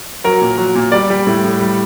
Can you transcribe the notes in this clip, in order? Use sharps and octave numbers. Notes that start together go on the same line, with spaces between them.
F#3 A#4
A#2
F#3
A#2
G3 D5
G3
A2
A2
G3